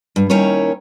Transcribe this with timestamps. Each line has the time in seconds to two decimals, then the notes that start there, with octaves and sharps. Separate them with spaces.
0.16 G2
0.30 D#2 D#3 C#4 E4 A#4 C#5